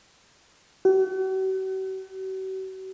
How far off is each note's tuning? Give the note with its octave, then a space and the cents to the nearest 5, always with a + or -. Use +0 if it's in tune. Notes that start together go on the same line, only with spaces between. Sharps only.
F#4 +45